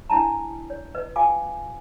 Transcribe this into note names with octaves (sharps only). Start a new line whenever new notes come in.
D4 E4 A5 A#5
C#5
B4 D#5
F4 F5 G5 G#5 D6